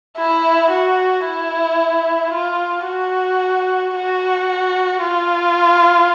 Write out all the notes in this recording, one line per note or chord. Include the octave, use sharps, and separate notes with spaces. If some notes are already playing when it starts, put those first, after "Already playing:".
E4
F#4
E4
F4
F#4
F#4
F4